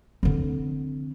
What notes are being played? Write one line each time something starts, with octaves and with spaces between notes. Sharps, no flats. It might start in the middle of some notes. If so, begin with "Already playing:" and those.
D3 C4